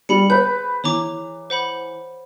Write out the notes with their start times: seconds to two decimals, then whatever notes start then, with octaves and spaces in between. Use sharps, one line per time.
0.09 G3 G#4 B5 C#7
0.30 B4 C5 G6
0.84 E3 C#5 A#5 D6
1.50 C5 F#5 B5